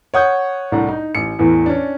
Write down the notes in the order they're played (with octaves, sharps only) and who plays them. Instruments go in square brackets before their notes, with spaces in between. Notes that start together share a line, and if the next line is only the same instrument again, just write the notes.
[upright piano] C#5 F#5 D#6 G6
C2 A2 D4 F#5 A#5
D#4
A1 C#7
E2 A2 E3
C#4 D4